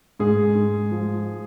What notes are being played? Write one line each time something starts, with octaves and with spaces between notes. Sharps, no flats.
G#2 G#4
G#2
F3